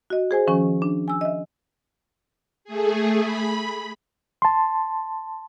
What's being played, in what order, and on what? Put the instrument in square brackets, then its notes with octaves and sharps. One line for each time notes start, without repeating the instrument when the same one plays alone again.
[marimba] F#4 D#5
G#4 C5 G#5
D#3 F3 C#4 G#5 C#6
D4
G#5 E6
D#5 E5
[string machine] A3 G#4
B5
[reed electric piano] A5 C6